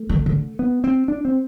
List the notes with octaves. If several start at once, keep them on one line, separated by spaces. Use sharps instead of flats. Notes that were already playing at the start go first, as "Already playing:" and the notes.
Already playing: A3
D3
D3
B3
C4
D4
C4